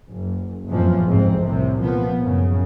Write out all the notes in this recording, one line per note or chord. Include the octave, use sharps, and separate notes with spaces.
F#1
F#1 F2 A2 E3 F3
F1 B1 G#2 C4
C2 A2 C3
A#2 F3 B3
F#2 A2 C#3